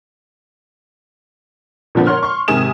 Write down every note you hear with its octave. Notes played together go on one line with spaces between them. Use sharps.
A#2 D3 F3 B3
A#4 C#5 F#5 C6 F6
C6 C#6
G#2 C3 D#3 G#5 D#6 E7